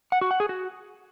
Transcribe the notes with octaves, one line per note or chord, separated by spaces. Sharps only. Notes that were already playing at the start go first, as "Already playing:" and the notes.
F#5
F#4
F#5
G#4
F#4